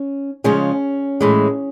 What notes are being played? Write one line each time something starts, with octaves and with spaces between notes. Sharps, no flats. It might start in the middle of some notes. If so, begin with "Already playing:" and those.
Already playing: C#4
C#3 F3 G#3 C#4
A2 E3 G#3